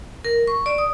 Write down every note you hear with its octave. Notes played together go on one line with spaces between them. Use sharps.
A#4
C#6
D5
D#6